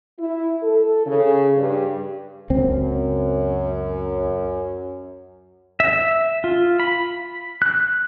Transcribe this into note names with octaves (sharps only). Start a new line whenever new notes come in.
E4
A4
C#3
G2
C#2 F#2 C4
E5
F4
B5
F#6